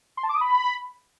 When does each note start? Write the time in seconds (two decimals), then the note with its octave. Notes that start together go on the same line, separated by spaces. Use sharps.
0.17 C6
0.23 A5
0.29 D6
0.35 D#6
0.41 B5